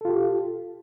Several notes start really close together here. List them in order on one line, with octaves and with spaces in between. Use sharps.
A4 F4 G4